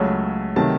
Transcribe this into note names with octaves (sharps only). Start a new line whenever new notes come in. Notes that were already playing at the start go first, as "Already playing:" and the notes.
Already playing: C#2 C#3 F#3 A3
C3 D#3 F#3 A3 A5